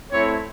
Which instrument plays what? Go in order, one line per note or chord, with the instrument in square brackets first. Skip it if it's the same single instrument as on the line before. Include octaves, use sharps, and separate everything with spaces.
[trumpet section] A3 C4 E4 C#5